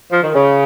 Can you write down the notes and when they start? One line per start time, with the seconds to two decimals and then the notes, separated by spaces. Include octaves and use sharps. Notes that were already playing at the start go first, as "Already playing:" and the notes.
0.11 F3
0.23 D#3
0.34 C#3